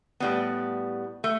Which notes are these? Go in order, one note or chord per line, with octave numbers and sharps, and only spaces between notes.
A2 G3 B3
A3